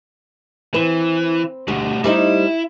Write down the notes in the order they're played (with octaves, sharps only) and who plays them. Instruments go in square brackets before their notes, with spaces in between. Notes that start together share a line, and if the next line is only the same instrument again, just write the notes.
[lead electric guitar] E3 [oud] C4 B4
[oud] D2 [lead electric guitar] B2 G3
[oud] G3 C4 D#4 [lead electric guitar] E4